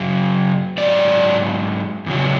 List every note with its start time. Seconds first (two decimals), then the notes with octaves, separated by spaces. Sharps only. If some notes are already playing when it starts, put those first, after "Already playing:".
Already playing: F#2 C#3 F#3
0.78 G#2 F#3 D5
2.06 E2 C#3 F#3